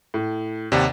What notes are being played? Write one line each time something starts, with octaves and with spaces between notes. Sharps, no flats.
A2
D#2 C3 D5 F#5